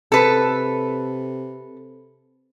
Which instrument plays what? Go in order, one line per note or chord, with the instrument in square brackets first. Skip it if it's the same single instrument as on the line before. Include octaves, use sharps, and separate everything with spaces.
[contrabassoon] C3 [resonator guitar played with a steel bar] A4 B4